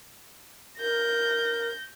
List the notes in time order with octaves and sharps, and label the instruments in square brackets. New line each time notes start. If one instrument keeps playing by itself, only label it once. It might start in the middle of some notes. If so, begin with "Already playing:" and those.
[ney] A#4 [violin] G6 A#6